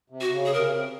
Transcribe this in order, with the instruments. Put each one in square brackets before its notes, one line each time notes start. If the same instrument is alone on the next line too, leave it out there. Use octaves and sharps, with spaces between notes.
[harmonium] C3
[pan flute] F#4
[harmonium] C3
C#3
[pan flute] G#4
[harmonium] C3 [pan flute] A#4
[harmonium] C#3
C3